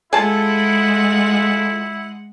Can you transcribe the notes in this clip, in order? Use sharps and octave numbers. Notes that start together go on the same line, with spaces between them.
G#3 E4 F4 G#4 A4 F#5 A5